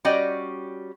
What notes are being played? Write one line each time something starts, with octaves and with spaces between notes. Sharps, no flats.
G3 C#4 F#4 D5 D#5 G5